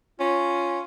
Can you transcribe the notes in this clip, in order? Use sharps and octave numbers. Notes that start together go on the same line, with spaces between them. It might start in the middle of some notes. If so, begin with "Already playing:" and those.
C#4 F4